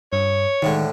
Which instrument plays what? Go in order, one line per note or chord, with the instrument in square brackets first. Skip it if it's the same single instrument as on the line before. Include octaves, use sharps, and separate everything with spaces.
[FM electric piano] G2 [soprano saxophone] C#5
[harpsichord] D2 A2 D3 [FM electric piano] D#3 G#3